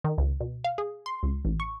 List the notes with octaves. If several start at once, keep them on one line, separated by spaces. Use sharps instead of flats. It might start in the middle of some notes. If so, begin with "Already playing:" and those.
D#3
C#2
B2
F5
G#4
C6
C#2
A1
C#6